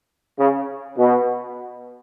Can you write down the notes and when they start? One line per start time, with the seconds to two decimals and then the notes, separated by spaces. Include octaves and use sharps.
0.40 C#3
0.98 B2